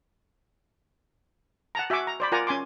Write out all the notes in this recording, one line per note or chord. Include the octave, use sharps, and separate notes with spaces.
F#5 A5 A#5
F#4 E5 F#5 G#5 D6
A#5
C5 D5 B5
F4 A#4 D5 F#5 G#5 A#5
C#4 G#5 C6 D6